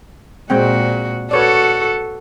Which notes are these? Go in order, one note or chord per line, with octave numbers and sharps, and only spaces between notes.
A#2 G#3 C4 F#4 G5
F#4 A4 B4 C#5 D5